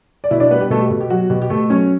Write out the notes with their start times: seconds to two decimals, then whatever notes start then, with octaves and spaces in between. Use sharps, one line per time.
0.24 D5
0.31 B2 E4 E5
0.40 D4 D5
0.51 G3 B3 B4
0.61 G4
0.70 B2 A3 A4
0.80 G4
0.91 B2
1.01 G4
1.10 F#3 F#4
1.30 B2 G4
1.42 G4
1.50 B2 A3 A4
1.70 F#3 C#4 C#5